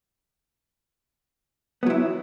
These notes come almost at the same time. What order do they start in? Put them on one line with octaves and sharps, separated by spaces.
B3 F#3 E4